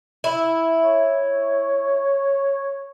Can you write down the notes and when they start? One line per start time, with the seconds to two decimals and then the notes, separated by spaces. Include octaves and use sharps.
0.24 E4
0.81 C#5